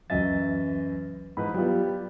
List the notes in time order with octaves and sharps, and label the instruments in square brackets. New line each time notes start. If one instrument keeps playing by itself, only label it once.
[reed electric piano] C#2 F#3 A6 [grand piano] F#2 D#5 E5 [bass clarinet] E3
[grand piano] G#2 E3 B4 [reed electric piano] B5
[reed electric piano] F#3 F4 [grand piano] G3 B3 [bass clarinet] G4